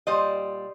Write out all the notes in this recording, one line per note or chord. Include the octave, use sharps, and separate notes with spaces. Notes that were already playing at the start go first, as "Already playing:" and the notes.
A#2 G3 C5 D#5